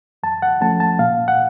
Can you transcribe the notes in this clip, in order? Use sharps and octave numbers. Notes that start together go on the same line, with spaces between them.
F#2 A5
F#5
F3 A3 C#4 A5
A5
A#2 F5
F#5